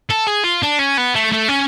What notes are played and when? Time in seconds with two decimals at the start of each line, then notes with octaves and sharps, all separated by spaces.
0.11 A4
0.28 G#4
0.44 F4
0.63 D4
0.79 C#4
0.97 B3
1.14 A3
1.32 A3
1.49 C#4